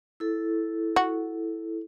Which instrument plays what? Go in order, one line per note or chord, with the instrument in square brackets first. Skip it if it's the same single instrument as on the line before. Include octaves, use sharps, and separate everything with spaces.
[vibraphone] E4 A4
[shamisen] F#4